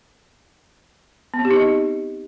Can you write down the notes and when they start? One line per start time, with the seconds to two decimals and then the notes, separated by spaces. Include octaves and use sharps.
1.34 B3
1.39 C4
1.45 G4
1.50 D#4
1.56 D#5